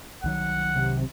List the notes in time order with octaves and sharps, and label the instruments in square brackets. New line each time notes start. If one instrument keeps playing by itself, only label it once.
[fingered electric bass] C2 D#3 F#3 [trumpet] F#5
[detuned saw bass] C3